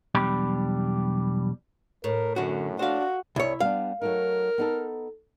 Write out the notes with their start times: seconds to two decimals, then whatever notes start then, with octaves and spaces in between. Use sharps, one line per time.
0.15 B1 E2 G3 D4 G4 B5
2.04 A2 A#4
2.36 F#2 D3 F#4
2.79 D4 F#4 C5 F5
3.36 C2 E4 C#5
3.60 G3 B3 D4 F5
4.01 F#3 A3 D#4 A#4
4.58 B3 D#4 A4